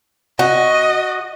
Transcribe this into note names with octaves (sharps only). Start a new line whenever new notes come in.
F#4 D#5